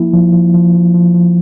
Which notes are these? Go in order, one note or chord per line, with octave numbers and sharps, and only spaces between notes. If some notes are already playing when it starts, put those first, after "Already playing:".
Already playing: F3 A#3 E4
F3
F3
F3
F3
F3
F3